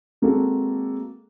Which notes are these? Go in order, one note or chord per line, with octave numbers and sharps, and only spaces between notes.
G#3 A#3 C4 F#4 A4